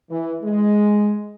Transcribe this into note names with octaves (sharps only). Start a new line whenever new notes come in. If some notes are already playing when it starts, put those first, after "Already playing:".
E3
G#3